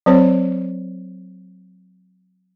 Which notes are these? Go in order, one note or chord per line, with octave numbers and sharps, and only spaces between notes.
F#3 C4 C5 C#5